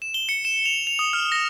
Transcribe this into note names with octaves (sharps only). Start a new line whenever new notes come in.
E7
G7
C#7
E7
F7
F7
D#6
F6
A#6